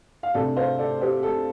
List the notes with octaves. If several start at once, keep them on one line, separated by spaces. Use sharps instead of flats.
F5
C3 A3 D4 A4 D5
C5 F5
A4 D5
G4 C5
A4